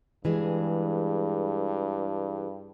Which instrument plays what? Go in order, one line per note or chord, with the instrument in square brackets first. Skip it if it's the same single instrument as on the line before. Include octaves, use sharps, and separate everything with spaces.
[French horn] G2 [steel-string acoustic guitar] E3 G#3 G#4